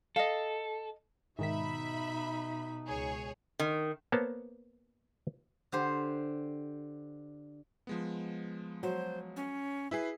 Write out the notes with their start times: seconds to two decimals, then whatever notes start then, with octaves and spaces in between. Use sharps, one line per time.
0.16 A4 D#5 F5
1.39 G#2 B2 D#3 D#4 E5 B5 B6
2.87 C#2 G#4 C#5
3.59 D#3
4.12 A#3 B3 C5 C#5 A5
5.72 D3 G4 C5
7.87 F3 G#3 B3
8.83 F#3 C5
9.36 C#4
9.91 E4 G#4 B4 E5 C7